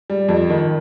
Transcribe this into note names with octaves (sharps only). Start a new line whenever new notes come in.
G3
F2
D#3